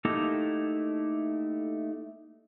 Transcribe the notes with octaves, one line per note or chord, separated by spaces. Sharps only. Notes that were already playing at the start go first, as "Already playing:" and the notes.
A3 A#3 D#4 E4 G4 A4